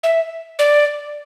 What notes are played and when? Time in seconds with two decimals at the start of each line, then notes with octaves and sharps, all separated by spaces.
0.03 E5
0.59 D5